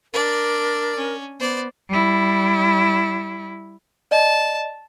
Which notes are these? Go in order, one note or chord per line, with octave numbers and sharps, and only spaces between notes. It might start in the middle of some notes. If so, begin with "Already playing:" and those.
D4 A#4 D5
C#4
B3 C5 D5
G3 E4
D5 D#5 A5